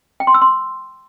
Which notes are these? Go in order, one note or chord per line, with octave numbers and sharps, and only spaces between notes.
G5
C6
E6
C6